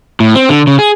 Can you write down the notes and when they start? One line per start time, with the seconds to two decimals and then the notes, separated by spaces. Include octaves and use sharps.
0.20 A2
0.35 C4
0.49 D3
0.67 C#3
0.79 G#4